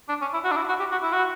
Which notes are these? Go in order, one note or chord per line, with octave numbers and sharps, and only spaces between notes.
D4
C#4
E4
F#4
D4
E4
F#4
G4
F#4
E4
F#4